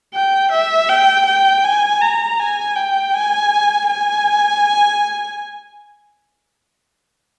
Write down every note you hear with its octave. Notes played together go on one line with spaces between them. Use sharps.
G5
E5
G5
G5
G#5
A#5
G#5
G5
G#5
G#5